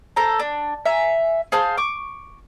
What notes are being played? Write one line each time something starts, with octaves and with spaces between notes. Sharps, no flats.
A4 C5 A#5
D4
E5 G#5 A#5
G#4 C5 F5 A5
C#6 D6